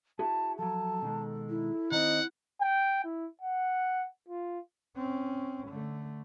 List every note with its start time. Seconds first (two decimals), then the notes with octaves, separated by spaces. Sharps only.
0.19 E4 F#4 G#4 A5
0.59 F3 F#3 A4 A5
1.02 B2 D#3 G#3
1.49 E4
1.92 D#3 C4 D#5 F#5
2.61 G5
3.04 E4
3.41 F#5
4.28 F4
4.96 C4 C#4
5.69 D3 A3